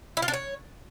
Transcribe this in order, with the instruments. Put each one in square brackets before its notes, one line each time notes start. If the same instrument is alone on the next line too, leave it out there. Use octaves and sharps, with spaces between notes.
[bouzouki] E4
F4
D4
C#5